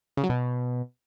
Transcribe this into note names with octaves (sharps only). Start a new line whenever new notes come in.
C#3
F#3
B2